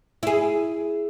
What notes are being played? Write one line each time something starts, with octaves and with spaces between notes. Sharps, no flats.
E4 G#4